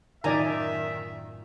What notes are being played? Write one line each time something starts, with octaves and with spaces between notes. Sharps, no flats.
F#2 A2 D#3 F4 D5 E5 G#5 A#5